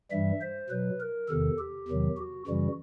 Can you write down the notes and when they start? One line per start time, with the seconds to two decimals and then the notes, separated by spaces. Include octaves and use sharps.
0.11 G2 E3 G3 E5
0.41 C5
0.70 B2 F#3 B4
1.00 A#4
1.29 E2 C3 D#3 A4
1.59 G4
1.88 E2 C3 D#3 F#3
2.18 F#4
2.47 F#2 C#3 E3 G3 F#4